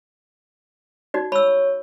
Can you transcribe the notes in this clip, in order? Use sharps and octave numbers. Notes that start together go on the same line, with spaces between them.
D#4 F#4 D5
C#5 B5 E6